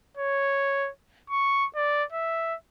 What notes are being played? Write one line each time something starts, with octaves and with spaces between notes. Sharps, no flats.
C#5
C#6
D5
E5